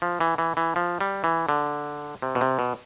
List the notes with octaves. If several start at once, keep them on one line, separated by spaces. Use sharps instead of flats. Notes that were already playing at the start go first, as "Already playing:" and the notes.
F3
E3
E3
E3
F3
G3
E3
D3
C3
B2
C3
B2